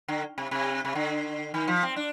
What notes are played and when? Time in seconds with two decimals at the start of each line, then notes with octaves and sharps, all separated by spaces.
0.08 D3
0.38 C3
0.51 C3
0.85 C3
0.95 D3
1.54 D#3
1.68 F3
1.83 C4
1.96 D4